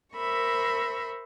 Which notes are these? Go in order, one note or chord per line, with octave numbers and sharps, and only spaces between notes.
A#4 C5 E5 B5 C#6